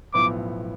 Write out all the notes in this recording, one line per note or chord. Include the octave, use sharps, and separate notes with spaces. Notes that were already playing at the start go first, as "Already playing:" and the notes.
B1 A2 F3 B3 D6